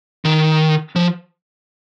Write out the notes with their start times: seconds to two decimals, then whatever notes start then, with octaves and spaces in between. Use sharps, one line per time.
0.25 D#3
0.96 F3